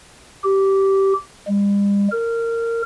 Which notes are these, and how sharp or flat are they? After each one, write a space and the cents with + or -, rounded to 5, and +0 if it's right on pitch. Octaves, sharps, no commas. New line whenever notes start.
G4 -15
G3 +45
A#4 -20